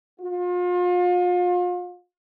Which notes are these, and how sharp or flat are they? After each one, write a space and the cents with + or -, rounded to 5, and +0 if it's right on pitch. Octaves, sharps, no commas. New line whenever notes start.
F4 +35